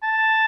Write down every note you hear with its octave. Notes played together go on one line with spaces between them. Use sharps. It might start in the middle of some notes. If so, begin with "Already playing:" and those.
A5